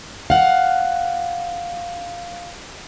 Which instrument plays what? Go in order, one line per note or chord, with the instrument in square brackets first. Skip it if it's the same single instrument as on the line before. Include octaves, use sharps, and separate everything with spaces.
[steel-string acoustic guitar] F5 F#5